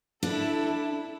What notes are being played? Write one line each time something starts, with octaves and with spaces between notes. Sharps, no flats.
D4 E4 A4